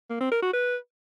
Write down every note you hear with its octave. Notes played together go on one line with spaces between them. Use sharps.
A#3
C4
A#4
F#4
B4